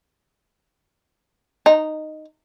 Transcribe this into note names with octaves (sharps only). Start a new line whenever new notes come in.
D#4